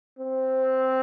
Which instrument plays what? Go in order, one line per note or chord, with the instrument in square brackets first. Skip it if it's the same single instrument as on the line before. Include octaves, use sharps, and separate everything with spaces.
[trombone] C4